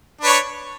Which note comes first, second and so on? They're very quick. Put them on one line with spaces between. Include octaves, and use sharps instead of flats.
D4 B4 C#5